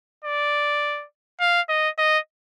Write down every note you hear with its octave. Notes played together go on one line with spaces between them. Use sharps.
D5
F5
D#5
D#5